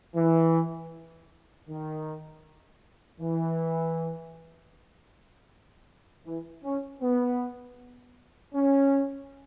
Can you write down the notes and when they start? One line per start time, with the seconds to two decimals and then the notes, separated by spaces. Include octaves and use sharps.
0.15 E3
1.68 D#3
3.20 E3
6.26 E3
6.64 C#4
7.02 B3
8.54 C#4